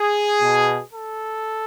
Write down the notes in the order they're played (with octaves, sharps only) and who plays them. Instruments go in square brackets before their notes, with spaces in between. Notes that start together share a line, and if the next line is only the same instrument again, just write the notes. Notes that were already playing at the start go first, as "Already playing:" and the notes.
Already playing: [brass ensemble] G#4
B2
A4